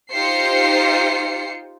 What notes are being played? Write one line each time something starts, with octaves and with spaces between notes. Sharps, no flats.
D#4 F4 G4 C5 C7 C#7